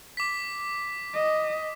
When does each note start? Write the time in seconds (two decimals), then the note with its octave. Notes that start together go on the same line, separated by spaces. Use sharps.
0.17 D6 B6
1.13 D#5